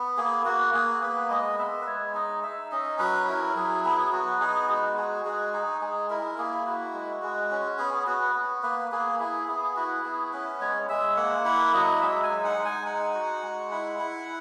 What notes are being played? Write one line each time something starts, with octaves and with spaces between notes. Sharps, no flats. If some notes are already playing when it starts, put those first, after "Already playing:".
Already playing: B3
A#3 G#4
A#3 F#4
A#3 G#4
B3 B4
G#3 D#5
B3 E5
B4
G#3 C#5
D#4 D#5
D#4 E5
C#4 D#5
F#3 B4
E4 A#4
F#3 G#4
B3 G#4
B3 F#4
D#4 G#4
G#3 F#4
F#4 G#4
G#3 G#4
D#4 G#4
G#3 G#4
E4 A#4
A#3 G#4
E4 F#4
G#3
G#3
C#4
B3 G#4
B3 F#4
B3
A#3 B4
A#3 G#4
E4 G#4
B3 G#4
E4 F#4
B3 G#4
C#4 B4
G#3 C#5
G#3 E5
A#3 F#5
E4 F#5
F#3 D#5
G#3 E5
G#5
D#4
F#5
G#3
G#5
D#4 F#5
F#4
G#3
E4
E4